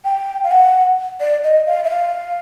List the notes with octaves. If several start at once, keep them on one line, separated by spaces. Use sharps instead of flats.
G5
F5
F#5
D5
D#5
F5
E5
F5